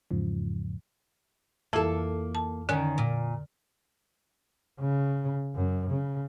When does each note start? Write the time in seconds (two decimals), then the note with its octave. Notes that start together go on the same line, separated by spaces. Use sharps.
0.11 E2 G#2 C#3 F3
1.73 F2 E3 A#3 E4 A4
2.35 A5
2.69 D3 D#3 C#4
2.98 A#2
4.80 C#3
5.55 F#2
5.90 C#3